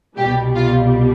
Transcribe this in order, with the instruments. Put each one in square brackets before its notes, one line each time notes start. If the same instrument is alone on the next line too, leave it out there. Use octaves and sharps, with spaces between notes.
[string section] C2 B2 G3 G4
F4